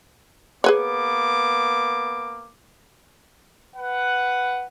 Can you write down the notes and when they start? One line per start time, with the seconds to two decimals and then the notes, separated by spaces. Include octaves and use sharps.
0.64 A#3 B3 G#4 B4 C#5 D6
3.75 B4 F#5